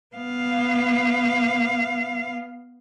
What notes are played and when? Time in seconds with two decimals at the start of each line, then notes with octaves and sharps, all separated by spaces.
0.15 B3 F5